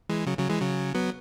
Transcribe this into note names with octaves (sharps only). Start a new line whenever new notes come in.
E3 G#3
C#3 F#3
C#3 F#3
E3 G#3
C#3 F#3
F#3 B3